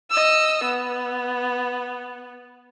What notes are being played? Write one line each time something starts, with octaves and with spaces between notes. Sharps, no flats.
D#5 E6
B3